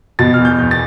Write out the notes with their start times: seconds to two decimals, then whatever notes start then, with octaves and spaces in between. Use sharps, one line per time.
0.19 B2 A6
0.34 E2 F6
0.45 G6
0.59 E2
0.71 A6